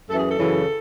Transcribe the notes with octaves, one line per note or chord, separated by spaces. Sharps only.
F#2 E3 A4
G#4
A4
F#2 C#3 E3